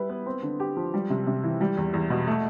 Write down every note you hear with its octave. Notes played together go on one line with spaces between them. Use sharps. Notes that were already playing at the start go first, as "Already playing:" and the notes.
Already playing: G3 E4 B4
B3
C4
D3
G4
F3
G3
C3
C3
E3
G3
E2
E2
B2
A3